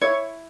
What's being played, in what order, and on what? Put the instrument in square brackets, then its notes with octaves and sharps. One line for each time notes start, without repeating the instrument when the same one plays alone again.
[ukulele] E4 C#5